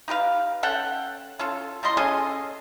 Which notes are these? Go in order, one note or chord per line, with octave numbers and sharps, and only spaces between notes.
D#4 G4 B4 F5
C#4 A4 F#5 G5
C#4 F4 A4
G3 E4 D#5 C6
C#4 G#4 A4 D#5